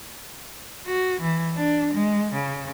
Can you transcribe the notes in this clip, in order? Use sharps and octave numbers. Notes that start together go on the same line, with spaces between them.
F#4
E3
D4
G#3
C#3